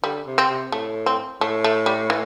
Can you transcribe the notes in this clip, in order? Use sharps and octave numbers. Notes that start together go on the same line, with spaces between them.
D3 G3
C3
C4
C3
A2 A3
C4
A2 A3
A3
G3
E3